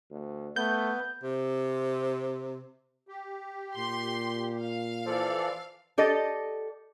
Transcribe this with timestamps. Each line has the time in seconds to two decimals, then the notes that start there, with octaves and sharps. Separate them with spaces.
0.11 D2
0.56 A3 B3 G6
1.24 C3
3.08 G4
3.77 A#2 C6
4.61 F5
5.06 E3 F3 A4 D5
5.98 G4 A4 D5 D#5